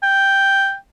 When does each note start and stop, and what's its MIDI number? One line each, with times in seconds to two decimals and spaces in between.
0.03 0.75 79